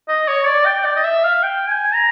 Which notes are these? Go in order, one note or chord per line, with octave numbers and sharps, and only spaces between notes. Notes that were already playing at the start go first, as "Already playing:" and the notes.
D#5
C#5
D5
G5
D5
D#5
E5
F5
G5
G#5
A#5